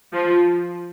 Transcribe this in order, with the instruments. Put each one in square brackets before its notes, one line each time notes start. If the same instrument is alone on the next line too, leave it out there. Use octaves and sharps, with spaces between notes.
[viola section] F3